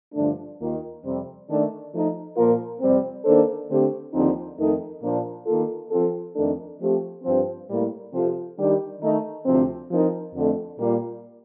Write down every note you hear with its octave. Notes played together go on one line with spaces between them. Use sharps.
G2 D3 F3 A3 D4
D#2 D#3 A#3 F4
F2 C3 G3 C4
D#3 A3 D4
F3 A3 D#4
A#2 F3 A#3 F4 A#4
F2 C3 G3 C4
D#3 A#3 D4 A4 C5
D3 A3 C4 G4
D#2 D3 F3 C4 D#4
F2 D#3 A3 D#4 A#4
A#2 F3 A#3 D4
D#3 A#3 F4 A4
F3 C4 F4 A4
F2 D#3 A3 D4 A4
F3 A3 C4 G4
G2 F3 C4
A2 G3 A#3
C3 F3 C4 F4 A4
D#3 G3 D4 G4
D#3 A3 D#4
D2 C3 F3 C4
F3 C4 D#4 A#4
F2 D3 A3
A#2 G3 A#3 F4